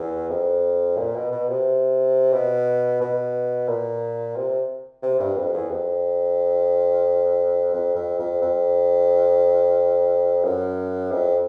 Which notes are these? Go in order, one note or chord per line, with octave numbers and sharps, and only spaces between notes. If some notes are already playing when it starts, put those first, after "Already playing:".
Already playing: E2
F2
A#2
B2
B2
C3
B2
B2
A#2
C3
C3
G2
F2
E2
F2
F2
F2
F2
F2
F#2
F2